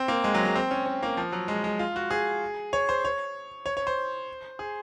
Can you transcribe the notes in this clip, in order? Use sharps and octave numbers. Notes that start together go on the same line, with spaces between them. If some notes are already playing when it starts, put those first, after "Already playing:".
Already playing: C4
A#3
G#3
F#3
G#3
C4
C#4
C#4
A#3
F3
F#3
G#3
G#3
F4
F#4
G#4
C#5
C5
C#5
C#5
C#5
C5
G#4